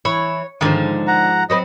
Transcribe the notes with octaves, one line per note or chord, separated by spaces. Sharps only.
E3 E4 C#5
G#2 D3 D#3 F3
F#5 A#5
F#3 C4 B4 D#5